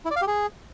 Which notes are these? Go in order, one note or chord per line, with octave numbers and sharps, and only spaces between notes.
E4
D5
F5
G4
G#4